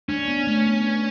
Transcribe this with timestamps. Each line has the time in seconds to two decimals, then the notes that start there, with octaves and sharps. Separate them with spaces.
0.09 C#4 D4
0.28 B3
0.47 A3
0.66 B3